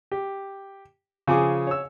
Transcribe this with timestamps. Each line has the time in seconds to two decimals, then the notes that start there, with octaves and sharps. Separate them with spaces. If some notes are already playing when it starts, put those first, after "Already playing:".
0.12 G4
1.27 C#3 F3 G#4 D6
1.67 C#5 E6